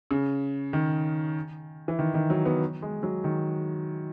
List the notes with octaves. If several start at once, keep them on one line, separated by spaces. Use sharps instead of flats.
C#3
D#3
E3
D#3
D#3
F#3
B3
G#3
F#3
D#3